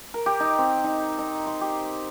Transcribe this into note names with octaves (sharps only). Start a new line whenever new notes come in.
A#4
G4
D#4
C4
D#4
D#4
C6
G4